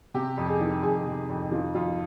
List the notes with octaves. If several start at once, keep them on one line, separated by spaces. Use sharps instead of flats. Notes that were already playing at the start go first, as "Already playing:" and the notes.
C3 G4
F2
G#4
D#3
F2 G#4
C3
F2
D#3 F4
F2 F4